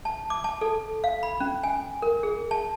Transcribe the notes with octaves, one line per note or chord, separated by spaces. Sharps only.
A5
D6
A5
A4
F5
B5
C#4
G#5
A#4
G#4
A5